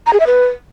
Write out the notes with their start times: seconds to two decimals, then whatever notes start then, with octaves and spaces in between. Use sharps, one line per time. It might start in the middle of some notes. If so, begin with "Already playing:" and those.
0.06 A#5
0.13 G#4
0.20 E5
0.26 B4